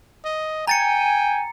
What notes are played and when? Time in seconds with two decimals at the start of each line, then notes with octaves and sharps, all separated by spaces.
0.25 D#5
0.67 G5 G#5 A#5 A6 C#7